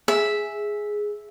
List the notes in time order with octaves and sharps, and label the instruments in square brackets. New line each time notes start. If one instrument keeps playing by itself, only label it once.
[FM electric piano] G#4 [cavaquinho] E5